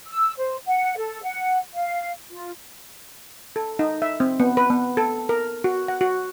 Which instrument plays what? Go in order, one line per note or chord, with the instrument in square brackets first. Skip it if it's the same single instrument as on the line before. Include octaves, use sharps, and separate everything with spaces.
[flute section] E6
C5
F#5
A4
F#5
F5
F4
[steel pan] A4
D#4
E5
C4
B3
B4
B3
A4
A#4
F#4
F#5
F#4